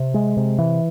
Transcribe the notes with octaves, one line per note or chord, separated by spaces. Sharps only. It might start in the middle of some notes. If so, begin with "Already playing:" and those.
Already playing: C3
G#3
C3
E3